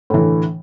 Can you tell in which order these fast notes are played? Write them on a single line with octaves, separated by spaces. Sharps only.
A2 E3 D3